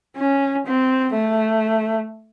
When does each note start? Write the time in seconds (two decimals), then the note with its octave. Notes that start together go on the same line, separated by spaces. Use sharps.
0.16 C#4
0.66 C4
1.13 A3